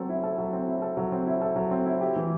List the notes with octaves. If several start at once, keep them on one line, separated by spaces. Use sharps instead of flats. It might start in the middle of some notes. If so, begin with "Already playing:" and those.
Already playing: F#3 C4 A4
E4
A4
F#3
C4
E4
A4
F#3
C4
E4
A4
F#3
C4
E4
G4
E3